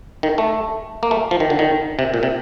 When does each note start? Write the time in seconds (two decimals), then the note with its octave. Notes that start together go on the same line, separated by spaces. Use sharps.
0.23 D#3
0.38 A3
1.03 A#3
1.11 A3
1.31 F3
1.40 D#3
1.50 D3
1.59 D#3
1.99 C3
2.14 A#2
2.23 C3